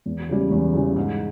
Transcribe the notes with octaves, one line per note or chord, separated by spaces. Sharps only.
E2
C#3 E3 G3
E2
C#3 E3 G3
G#2